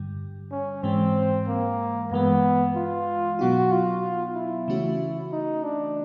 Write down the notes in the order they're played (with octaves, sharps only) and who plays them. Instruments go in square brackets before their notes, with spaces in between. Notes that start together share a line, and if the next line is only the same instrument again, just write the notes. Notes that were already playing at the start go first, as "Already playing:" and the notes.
Already playing: [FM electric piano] G2 D3 G3
[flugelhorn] C#4
[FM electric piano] G#2 E3 G#3 [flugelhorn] C4
[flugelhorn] A#3
[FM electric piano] G2 E3 G#3 [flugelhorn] B3
[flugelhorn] F4
[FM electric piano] B2 F#3 B3 D#4 [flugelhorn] F#4
[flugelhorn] F4
E4
[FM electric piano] C#3 E3 A3 C#4 F#4
[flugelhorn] D#4
D4